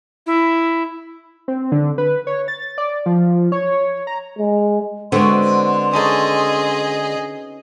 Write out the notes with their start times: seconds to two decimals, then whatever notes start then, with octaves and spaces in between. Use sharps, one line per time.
0.26 E4
1.48 C4
1.72 D3
1.98 B4
2.27 C#5
2.48 A6
2.78 D5
3.06 F3
3.52 C#5
4.07 A#5
4.39 G#3
5.12 D3 G#3 B3 C4 F#4 C6
5.93 C#4 D#4 G#4 A4 D#5